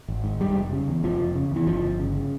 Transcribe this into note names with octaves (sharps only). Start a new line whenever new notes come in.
G#1
G#2
F1 G3
F1
C#3
E2
F1 F3
F1
C#3
E2 E3
G1 F3
G1
C#3